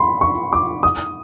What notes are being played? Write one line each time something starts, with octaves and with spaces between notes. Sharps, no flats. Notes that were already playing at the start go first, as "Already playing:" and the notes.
Already playing: B5 C6
C#6
D6
D#6